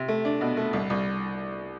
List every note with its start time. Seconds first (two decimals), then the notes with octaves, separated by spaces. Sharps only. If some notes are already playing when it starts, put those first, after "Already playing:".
Already playing: C3
0.08 A3
0.25 D4
0.41 B2
0.57 A3
0.73 C2
0.90 C2